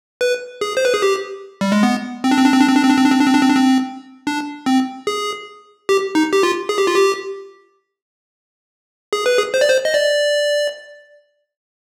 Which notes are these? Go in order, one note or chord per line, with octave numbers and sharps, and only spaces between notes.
B4
G#4
C5
B4
G#4
G4
G3
G#3
B3
C4
D4
C4
D4
C4
D4
C4
D4
C4
D4
C4
D4
C4
D4
C4
D4
C4
D4
C4
D4
C4
G#4
G4
D#4
G4
F4
G#4
G4
F4
G4
G#4
B4
G#4
C5
D5
C5
D#5
D5